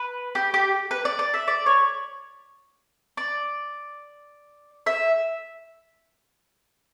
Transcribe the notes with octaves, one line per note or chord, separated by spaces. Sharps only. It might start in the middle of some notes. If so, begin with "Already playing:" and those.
Already playing: B4
G4
G4
B4
D5
D5
E5
D5
C#5
D5
E5